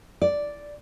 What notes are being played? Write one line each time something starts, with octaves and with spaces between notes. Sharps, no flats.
D5